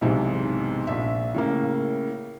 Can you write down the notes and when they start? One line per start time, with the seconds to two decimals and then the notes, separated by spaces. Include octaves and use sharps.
0.01 B1 E2 G#2 C3
0.87 A#1 E5
1.34 A2 C#3 A#3